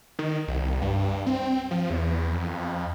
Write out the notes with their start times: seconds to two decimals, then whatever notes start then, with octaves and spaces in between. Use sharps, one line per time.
0.19 D#3
0.48 C2
0.82 G2
1.27 C4
1.71 F3
1.90 E2
2.34 F2